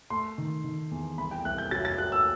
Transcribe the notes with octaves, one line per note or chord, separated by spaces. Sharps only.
A3 C6
D#3
D#3
E2
C2 B5
G5
C2 F#6
G6
F#3 A6
A6
F#3 F#6
E6